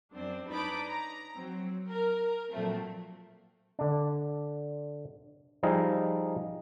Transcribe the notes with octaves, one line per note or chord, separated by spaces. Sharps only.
F#2 C4 D4
D4 D#4 B4 C#5 B5 D6
A#5
F#3 C4
A#4
A#2 F3 F#3 A3 C4
D3 D4
F3 G3 D#4 G#4 D#5 F5